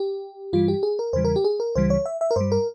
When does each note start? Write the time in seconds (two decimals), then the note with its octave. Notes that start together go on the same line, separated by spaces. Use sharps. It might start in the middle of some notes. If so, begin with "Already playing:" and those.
Already playing: G4
0.53 G2 E3 G3 F4
0.68 G4
0.83 G#4
0.99 A#4
1.13 E2 C#3 E3 G3 C5
1.25 A#4
1.36 G4
1.44 G#4
1.60 A#4
1.75 C#2 C#3 E3 G3 C5
1.90 C#5
2.06 E5
2.21 E5
2.31 A#4
2.36 G2 G3 C5
2.52 A#4